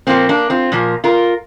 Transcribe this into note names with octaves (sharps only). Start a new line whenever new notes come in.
A#2 F3 A#3 C4
A#3 D4
C4 F4
A#2 F3 A#3
F4 A#4